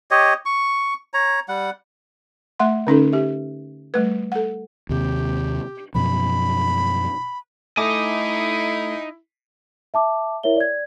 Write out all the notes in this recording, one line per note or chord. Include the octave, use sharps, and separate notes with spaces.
G4 C#5 D#5
C#6
C#5 A#5
G3 F#5
A3 E5 F#5 C6
D3 C#4 D#4 A4
G4 E5
G3 A3 B4
A4 F#5
D#2 C3 G4
F#2 B2 F3 B5
A3 D#4 E4 A4 D#5 G#5 D6 D#6
E5 A5 D6
E4 A#4 C#5 E5 G7
D5 G#6